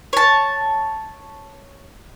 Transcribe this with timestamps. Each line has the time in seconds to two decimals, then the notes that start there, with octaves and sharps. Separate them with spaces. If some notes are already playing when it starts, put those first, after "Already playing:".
0.13 C#5 A5